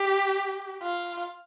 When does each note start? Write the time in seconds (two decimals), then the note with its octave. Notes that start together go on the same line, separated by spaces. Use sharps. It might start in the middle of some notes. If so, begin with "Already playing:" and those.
Already playing: G4
0.82 F4